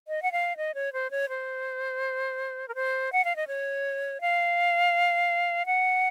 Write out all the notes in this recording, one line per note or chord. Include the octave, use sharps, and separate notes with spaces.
D#5
F#5
F5
D#5
C#5
C5
C#5
C5
A#4
C5
F#5
F5
D#5
C#5
F5
F#5